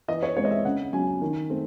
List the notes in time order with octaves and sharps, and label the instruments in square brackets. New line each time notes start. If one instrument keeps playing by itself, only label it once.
[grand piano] E3 D#5
C#5
G#3 C4 C#5
D#5
E5
C#3 F#5
F#3 C#4 G#5
D#3
A3 C4